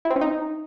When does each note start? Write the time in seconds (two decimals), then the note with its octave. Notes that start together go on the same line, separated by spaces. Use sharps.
0.05 E4
0.10 C4
0.16 C#4
0.21 D#4